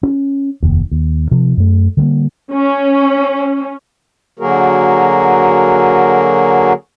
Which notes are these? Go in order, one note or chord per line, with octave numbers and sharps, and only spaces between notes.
C#4
F1 D#2
D#2
C3 F3
F#2 A3
D3 G3 A3 A#3
C#4
D3 F#3 A#3 F#4 G#4 A#4